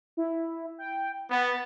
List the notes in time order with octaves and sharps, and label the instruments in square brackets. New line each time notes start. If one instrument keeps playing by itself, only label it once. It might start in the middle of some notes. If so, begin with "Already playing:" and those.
[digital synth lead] E4
G5
[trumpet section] B3 [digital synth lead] A6